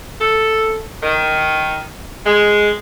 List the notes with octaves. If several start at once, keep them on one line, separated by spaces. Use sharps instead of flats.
A4
D#3
G#3